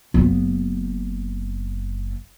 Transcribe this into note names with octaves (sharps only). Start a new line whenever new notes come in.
F#1 B3